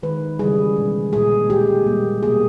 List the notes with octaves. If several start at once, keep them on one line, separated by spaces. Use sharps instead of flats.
D#3 G#3 B4
C#3 E3 G3 G#4
B2 G#3
A#2 G#3 G#4
A#2 G#3 G4
A#2 G3 A#3
B2 A#3 G#4